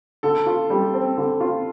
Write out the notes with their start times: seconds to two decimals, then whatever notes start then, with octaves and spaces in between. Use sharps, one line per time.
0.23 D3 A4
0.46 F4
0.70 G3
0.94 C4
1.17 D3
1.40 F4